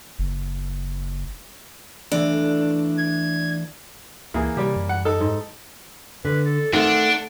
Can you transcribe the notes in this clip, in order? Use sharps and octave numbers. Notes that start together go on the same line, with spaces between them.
F#1
E3 A3 D4
G#6
C#2 E3 A#3 G#4
C3 G3 G4
F#2
F#5
D#4 A4
G#2
D3 B4
A4
D#3 A3 C4 D4 F#5